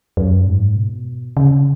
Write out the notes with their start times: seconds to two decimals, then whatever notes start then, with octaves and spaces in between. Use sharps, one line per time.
0.17 F#2
0.47 G#2
0.76 B2
1.37 C#3